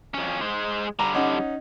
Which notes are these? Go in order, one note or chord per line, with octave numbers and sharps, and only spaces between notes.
F2 C#4
G#3 C5
D3 G3 A#5
C#4 D#4 F#5